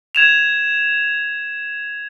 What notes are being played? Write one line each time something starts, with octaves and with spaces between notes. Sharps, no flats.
G#6 E7 F7